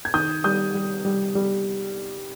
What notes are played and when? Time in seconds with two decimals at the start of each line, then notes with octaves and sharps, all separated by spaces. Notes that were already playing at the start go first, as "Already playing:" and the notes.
0.05 G#6
0.14 D#3 D#6 G6
0.44 G3 D#6 G6
0.74 G3
1.05 G3
1.35 G3